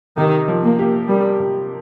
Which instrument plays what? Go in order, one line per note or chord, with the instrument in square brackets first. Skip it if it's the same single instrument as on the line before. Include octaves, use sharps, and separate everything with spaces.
[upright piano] C3 [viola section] D#3 D#4
[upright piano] F3
[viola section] A#3
[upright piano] G4
[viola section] G3 [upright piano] A#3
[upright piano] C3